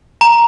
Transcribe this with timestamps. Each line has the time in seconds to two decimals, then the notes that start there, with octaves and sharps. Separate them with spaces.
0.21 A#5